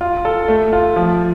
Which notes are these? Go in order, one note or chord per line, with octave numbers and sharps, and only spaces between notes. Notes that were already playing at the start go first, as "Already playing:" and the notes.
F4
A4
A3
F4
F3